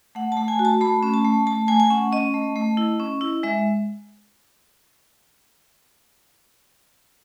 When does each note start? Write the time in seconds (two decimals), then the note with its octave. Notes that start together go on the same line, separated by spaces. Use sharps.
0.15 A3 F#5
0.32 A5
0.37 A3
0.48 G#5
0.59 F#4
0.65 A5
0.81 A3 B5
1.03 C#4
1.14 A5
1.25 A3
1.47 A3 A5
1.68 A3 G#5
1.80 G#5
1.90 C#4 F#5
2.12 C#4 D#5
2.34 A3
2.56 A3
2.77 E4
3.00 C#4
3.21 E4
3.43 G#3 E5